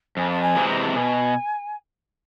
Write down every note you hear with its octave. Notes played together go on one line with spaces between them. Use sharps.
F2 G#5
A5
G#5
C3 E3 G#3 C4
A#5
A5
B2 G#5